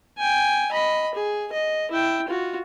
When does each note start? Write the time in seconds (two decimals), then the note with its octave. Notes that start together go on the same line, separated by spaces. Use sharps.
0.18 G5 G#5
0.72 D#5 B5
1.15 G#4
1.53 D#5
1.91 E4 G5
2.28 F4 F#4